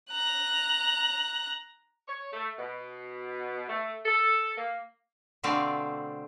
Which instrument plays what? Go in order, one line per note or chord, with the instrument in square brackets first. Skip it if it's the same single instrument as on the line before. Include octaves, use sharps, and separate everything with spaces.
[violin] A#5 F#6
[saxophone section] C#5
A3
B2
A3
A4
A#3
[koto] B2 D3 A3 C4 D5 F5